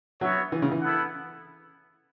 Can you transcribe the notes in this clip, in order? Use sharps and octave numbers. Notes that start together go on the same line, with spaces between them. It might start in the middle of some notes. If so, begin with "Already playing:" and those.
F#3 B3 F#4 C#5 E5
E3
C#3
E3
B3 E4 A4 F#5